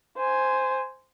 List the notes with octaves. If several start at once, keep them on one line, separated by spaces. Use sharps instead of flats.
C5 G#5